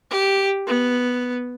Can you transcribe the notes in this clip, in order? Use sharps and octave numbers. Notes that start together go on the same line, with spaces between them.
G4
B3